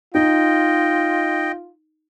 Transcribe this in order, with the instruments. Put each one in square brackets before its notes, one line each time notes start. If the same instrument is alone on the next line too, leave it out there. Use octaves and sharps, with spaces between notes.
[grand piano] D#4 [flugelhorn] F4 [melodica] D#5 G5